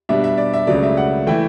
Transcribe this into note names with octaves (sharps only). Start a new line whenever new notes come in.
B2 G3 D4 E5
E5
D5
E5
C#2 C#3 F#3 A3 D5
E5
F#5
E3 A3 E4 G5